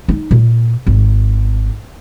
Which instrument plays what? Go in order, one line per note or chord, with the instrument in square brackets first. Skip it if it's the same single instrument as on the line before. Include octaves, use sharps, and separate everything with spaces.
[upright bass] D#4
A#2
G#1